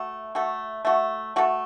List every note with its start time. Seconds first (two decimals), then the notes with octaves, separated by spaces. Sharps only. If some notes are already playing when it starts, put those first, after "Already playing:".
Already playing: A3 F#4 A4
0.35 A3 F#4 A4
0.85 A3 F#4 A4
1.36 A3 F#4 A4